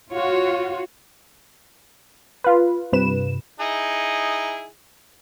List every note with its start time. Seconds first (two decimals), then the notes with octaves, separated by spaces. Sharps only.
0.12 F4 F#4 C#5
2.44 F4 B4
2.92 G2 C3 B4 E7
3.60 D#4 E4 G#4